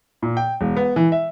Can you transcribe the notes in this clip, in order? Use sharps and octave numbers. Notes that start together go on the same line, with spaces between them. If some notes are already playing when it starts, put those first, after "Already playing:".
A#2
G5
E1
B3
E3
E5